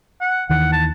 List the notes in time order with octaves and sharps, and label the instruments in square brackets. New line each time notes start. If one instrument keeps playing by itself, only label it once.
[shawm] F#5
[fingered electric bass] D#2 D#3 E3 [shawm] F#5
[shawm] A5